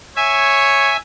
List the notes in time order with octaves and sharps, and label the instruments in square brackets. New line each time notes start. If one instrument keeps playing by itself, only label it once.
[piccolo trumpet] C#5 [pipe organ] E5 G#5